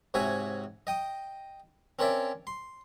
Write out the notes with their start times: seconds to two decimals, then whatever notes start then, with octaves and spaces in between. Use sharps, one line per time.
0.14 G#2 C3 F#4 C#5 E5 G#5
0.87 D#5 G5 D#6
1.99 C4 C#4 A#4 C#5 D5 E5
2.47 C6